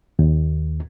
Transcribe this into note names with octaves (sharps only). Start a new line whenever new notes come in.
D#2